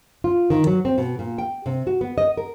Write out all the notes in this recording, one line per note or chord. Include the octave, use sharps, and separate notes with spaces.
F4
D#3
F#3
C4
B2
A#2
G5
C3
F#4
B3
D#5
A#4